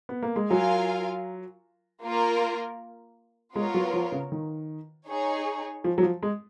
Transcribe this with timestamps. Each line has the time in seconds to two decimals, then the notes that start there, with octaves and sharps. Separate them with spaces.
0.09 B3
0.23 A#3
0.36 G#3
0.50 F#3 F4 A#4 F5 G#5
2.03 A#3 F4 A#4
3.56 G#3 B3 F4 A#4 C#5
3.74 F#3
3.93 F3
4.12 C#3
4.32 D#3
5.08 D#4 G#4 C#5
5.84 F3
5.98 F#3
6.03 F3
6.23 G#3